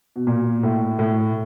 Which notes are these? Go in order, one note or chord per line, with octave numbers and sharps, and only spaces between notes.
B2
A#2
A2
A2